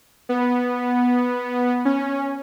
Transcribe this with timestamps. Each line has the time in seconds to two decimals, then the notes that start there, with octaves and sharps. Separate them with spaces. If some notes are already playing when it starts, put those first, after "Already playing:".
0.29 B3
1.85 C#4